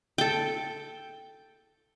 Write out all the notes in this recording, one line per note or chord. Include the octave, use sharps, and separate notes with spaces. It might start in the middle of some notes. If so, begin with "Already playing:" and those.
A4 G5